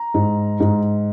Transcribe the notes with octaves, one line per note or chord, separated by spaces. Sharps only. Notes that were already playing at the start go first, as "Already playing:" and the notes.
Already playing: A#5
G#2
G#2